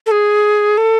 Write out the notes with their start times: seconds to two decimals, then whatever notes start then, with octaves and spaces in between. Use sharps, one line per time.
0.06 A4
0.11 G#4
0.78 A4